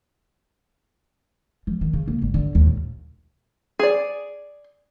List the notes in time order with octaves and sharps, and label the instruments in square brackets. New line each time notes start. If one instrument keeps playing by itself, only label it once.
[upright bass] F3
D#3
C#3
A#3
G1
D3
D#2
A#2
[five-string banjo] G#4 D5